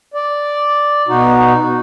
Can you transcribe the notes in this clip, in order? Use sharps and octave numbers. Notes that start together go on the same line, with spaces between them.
D5
B2 D#4 F#4